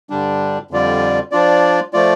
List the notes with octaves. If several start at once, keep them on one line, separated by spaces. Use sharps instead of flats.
G2 D3 G3 D4
F2 D3 G3 F4 D5
F3 D4 F4 D5
F3 A3 F4 D5